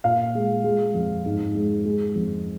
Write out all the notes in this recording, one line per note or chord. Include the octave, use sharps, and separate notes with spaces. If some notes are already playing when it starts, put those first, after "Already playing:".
A#2 F5
G#3
G#3
F2
G#2
G#3
G#3
F2